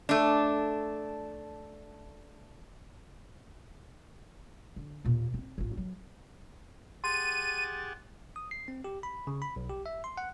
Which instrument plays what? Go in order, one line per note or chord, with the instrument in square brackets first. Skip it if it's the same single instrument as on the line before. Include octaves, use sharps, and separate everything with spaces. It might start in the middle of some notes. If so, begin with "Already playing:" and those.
[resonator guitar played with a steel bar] A3 D4
[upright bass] D3
D#2 A#2
C4
A1 F4
F#3
[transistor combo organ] G4 G#4 F#5 [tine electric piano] C6 [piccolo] A6 [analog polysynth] D#7
[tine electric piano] D#6
C7
C4
G4
B5
C#3
B5
B1
G4
E5
C6
F#5